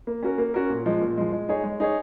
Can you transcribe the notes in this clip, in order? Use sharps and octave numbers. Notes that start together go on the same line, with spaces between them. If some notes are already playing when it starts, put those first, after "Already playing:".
A#3
C#4 F#4 A#4
A#3
C#4 F#4 A#4
A#2
F3 G#3
A#2
F3 G#3
G#3
D#4 G#4 C#5
G#3
D#4 G#4 C#5